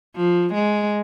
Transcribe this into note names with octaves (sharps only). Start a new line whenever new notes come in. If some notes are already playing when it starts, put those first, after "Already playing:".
F3
G#3